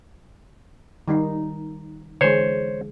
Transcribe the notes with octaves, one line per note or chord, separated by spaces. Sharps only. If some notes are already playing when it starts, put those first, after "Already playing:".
D#3 G3 D#4
D3 E3 G#3 C5 C#5